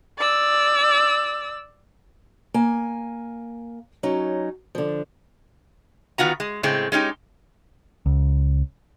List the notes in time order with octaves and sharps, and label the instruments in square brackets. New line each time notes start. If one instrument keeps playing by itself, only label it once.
[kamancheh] D5 E6
[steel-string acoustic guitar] A#3 G#5
F#3 C#4 D#4
D3 F3
[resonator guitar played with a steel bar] D#3 B3 F4 F#4 A#5
G#3
A2 C#3 G#3 C4
G#3 C#4 D#4 G4
[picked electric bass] C#2